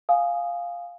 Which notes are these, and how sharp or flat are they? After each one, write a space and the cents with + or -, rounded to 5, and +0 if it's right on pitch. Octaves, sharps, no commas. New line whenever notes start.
F5 +0 G#5 +0 D#6 +0